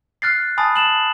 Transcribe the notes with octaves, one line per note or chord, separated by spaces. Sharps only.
F6 F#6 A6 C7
G#5 A5 B5 D#6 A6
A5 E7 F#7